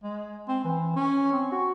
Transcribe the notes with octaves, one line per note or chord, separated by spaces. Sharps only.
G#3
C4
E3
C#4
C4
F#4